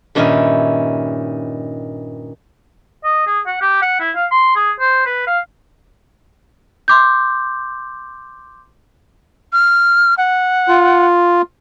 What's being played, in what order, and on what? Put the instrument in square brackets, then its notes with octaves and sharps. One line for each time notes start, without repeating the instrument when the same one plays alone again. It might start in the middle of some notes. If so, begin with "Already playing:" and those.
[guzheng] G2 A#2 D#3 C#4 D#4 E4
[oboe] D#5
G#4
F#5
G4
F#5
E4
F5
C6
G#4
C5
B4
F5
[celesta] C6 D6 G6
[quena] F6
F#5
[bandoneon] F4